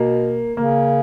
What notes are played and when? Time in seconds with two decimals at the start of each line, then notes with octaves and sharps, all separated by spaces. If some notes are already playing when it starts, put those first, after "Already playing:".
Already playing: B2 A#3
0.57 C#3 A#3